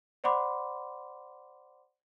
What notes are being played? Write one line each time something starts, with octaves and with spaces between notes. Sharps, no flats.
C5 D5 F#5 B5 C6 D6